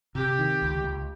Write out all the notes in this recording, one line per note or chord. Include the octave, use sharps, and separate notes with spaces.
C3 G4
D#3
C#2
C#2